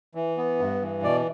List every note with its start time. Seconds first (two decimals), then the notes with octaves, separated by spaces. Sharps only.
0.15 E3
0.38 B3
0.59 G2
0.82 E3
1.03 B2 D5